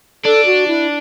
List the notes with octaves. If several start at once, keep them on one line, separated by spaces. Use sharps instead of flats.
D4 A4
F#4
E4